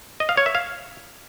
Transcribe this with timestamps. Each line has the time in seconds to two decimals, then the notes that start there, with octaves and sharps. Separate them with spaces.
0.20 D#5
0.29 F5
0.37 C#5
0.46 E5
0.55 F5